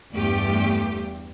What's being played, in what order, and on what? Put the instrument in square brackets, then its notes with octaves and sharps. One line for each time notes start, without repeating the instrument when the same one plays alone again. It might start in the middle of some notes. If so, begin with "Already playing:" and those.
[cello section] E2 G2 A3 G4